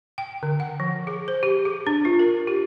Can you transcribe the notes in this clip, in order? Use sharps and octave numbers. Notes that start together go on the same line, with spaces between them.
G5
D3
F#5
F3
G#4
C5
G4
G#4
D4
F4
A#4
G4